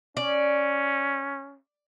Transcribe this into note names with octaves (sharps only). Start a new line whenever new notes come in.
C#4 D5